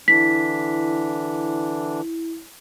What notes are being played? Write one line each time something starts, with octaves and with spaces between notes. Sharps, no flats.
D3 E3 D4 E4 B6